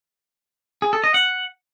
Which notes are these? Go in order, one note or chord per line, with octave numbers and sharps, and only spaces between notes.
G#4
A4
D#5
F#5